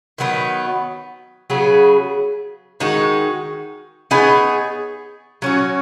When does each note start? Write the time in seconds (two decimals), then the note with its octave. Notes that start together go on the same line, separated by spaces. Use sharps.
0.18 D#3 F#3 B3 D#4
1.50 C#3 F#3 B3 G#4
2.80 D#3 G#3 D#4 F#4
4.11 B3 D#4 G#4 C#5
5.42 F#3 C#4 F#4